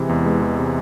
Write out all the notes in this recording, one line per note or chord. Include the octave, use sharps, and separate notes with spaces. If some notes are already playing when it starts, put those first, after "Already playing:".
Already playing: C3 E3 G#3
E2
G#3
E3
C3